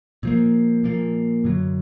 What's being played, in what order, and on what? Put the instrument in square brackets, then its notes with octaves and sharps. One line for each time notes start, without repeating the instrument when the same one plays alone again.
[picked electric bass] A#2 F3 A#3
A#2 F3 A#3
F#2 D3 F#3